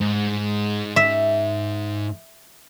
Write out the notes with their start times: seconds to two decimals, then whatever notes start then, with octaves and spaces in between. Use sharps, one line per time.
0.01 G#2
0.96 E5